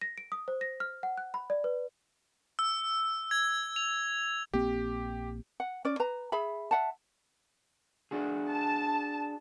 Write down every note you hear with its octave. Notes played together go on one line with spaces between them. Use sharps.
A#6
D7
D#6
C5
A#6
F6
F#5
F#6
B5
D5
B4
E6
G#6
F7
A#1 A#3 C4 G4
F#5
C#4 D5
B4 A#5
G#4 E5 B5
E5 F#5 A5
D4 F#4 G#4
A5